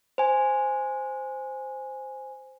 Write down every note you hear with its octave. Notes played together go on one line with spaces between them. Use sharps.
C5 G#5